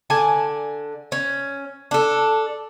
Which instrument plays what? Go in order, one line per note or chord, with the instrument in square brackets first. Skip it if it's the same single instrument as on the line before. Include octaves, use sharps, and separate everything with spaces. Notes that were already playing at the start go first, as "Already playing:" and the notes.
[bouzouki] D3 D5 G#5 A5
C#4
D4 A4